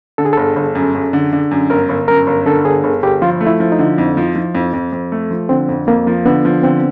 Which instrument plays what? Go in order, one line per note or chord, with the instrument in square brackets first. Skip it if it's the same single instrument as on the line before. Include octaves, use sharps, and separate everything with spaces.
[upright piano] D3 [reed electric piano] A4
[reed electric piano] G#4
[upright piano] G1 [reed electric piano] A4
[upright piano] G1
F#2
F#2
D3
D3
F#2
[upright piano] G1 [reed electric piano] A#4
[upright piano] G1
[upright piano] F#2 [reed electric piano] A#4
[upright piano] G1
[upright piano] D3 [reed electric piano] A4
[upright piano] G1 [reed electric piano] G#4
[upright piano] G1
[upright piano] G1 [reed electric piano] G4
[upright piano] F3 [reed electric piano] F4
[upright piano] A3
[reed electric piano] E4
[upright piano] F3
[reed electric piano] D#4
[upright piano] D3
F2
F3
F3
F2
F2
F2
A3
F3
[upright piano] D3 [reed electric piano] C4
[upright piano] F2
[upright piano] F2 [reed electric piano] A#3
[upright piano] F3
[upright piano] D3 [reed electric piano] B3
[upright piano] F3
[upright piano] D3 [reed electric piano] C4